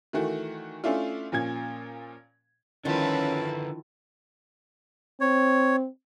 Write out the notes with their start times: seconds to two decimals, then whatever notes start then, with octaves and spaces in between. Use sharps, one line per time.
0.13 D#3 E3 A3 F#4
0.84 A3 C#4 D4 E4 F4
1.32 A#2 F3 C#4 G#6
2.85 D3 D#3 F3 C#4 E4 A#4 B4 A5
5.21 C4 C#5